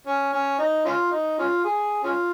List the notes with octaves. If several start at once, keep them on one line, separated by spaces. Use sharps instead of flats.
C#4
C#4
D#4
C#4 F4
D#4
C#4 F4
G#4
C#4 F4